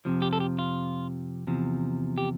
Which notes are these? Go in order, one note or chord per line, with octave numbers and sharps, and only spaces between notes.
F2 C3 F3
G4
A4
G4
F4
E2 C3 F3
G4